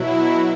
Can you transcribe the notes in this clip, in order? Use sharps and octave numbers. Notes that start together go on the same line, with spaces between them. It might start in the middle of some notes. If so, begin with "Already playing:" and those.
Already playing: B2 F#3 E4